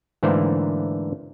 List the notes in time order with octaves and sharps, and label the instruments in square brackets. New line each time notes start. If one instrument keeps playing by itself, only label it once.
[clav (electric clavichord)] G#2 D3 E3 A3 A#3 C5